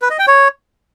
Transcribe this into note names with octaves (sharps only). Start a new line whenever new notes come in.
B4
D#5
G5
C#5